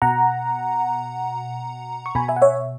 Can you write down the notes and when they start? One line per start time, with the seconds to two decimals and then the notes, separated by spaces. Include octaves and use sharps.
0.02 B2 F#5 A#5
2.06 C#6
2.15 B2 G#5 B5
2.28 E5 G#5
2.36 F#5
2.42 C#5 E5